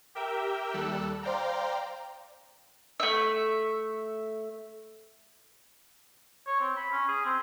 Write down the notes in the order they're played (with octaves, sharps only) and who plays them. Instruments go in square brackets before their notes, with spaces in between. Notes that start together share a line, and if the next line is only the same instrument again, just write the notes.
[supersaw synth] G4 A#4 E5 G5
D#2 G3 A4 E6 F#6
C5 D5 F5 G5 A#5
[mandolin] A3 E5
[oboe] C#5
C4
B5
C#4
G#4
C4